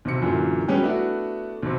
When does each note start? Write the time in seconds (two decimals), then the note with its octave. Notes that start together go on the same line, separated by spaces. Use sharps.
0.05 B1 C3 C#7
0.22 F#2 A#2 D3 E3
0.68 F#3 G3 B3 C#4 G4 G#4
0.82 A3 B3 D4 E4 F#4
1.63 B1 C3